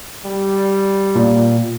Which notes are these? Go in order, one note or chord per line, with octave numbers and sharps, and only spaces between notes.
G3
A#2